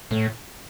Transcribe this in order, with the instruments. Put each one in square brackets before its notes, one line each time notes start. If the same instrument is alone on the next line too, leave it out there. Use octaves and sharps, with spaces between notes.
[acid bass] A2